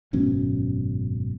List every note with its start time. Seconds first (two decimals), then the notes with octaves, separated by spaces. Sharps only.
0.13 G#1 F#2 B2 C#4